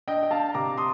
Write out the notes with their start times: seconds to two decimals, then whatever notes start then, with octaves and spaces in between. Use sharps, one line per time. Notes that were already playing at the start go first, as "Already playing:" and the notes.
0.08 D4 D#5 G5
0.23 G5
0.31 F5 A5
0.54 C3 A#5 D6
0.77 C6 D#6